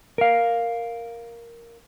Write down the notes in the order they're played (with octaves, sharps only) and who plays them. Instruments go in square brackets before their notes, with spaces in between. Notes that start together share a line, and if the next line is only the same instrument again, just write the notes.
[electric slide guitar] A#4 F5